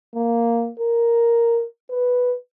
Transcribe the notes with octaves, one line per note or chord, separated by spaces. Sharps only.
A#3
A#4
B4